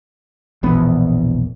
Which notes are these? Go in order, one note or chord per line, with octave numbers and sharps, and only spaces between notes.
E1 A#1 E2 B3